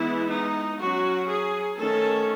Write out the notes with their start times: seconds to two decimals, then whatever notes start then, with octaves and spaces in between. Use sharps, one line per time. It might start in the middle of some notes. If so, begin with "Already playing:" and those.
Already playing: E3 G#3 B3 E4
0.30 D#4
0.80 F#3 C#4 F#4
1.29 G#4
1.78 D#3 A3 C#4 A4